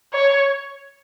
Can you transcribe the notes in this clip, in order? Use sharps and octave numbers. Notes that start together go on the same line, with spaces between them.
C#5